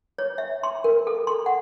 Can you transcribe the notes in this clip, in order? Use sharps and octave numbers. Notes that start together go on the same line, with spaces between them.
C#5
E5
C6
A#4
A4
C6
F#5